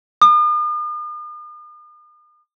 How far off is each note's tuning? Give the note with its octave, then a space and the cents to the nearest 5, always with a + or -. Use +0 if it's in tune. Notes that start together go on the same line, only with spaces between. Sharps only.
D#6 -45